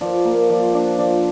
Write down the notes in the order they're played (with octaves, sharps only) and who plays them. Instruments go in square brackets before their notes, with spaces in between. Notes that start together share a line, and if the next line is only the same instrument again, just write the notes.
[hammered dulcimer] F3 D5
A#3 F5
F3 D5
C5
D4 D5
F3 D5